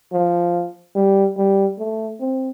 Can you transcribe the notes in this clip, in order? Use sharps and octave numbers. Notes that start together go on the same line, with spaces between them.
F3
G3
G3
A3
C4